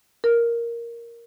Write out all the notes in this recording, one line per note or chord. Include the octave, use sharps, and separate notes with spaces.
A#4